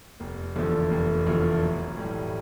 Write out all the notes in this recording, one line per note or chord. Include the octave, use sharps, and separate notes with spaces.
F1
E2 D3 F3 A3
F1
E2 D3 F3 A3
B1
A2 E3 G3